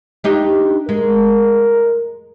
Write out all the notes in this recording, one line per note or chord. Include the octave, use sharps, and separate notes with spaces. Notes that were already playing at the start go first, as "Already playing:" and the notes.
D4 D#4 G4
G#3 A#4